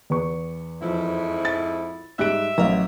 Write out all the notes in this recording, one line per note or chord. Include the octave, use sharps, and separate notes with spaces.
E2 B4 C#6
F2 G#2 F3 E4
A6
G#2 G3 E5 F#6 D7
A1 F#3 D#5 F5 A#5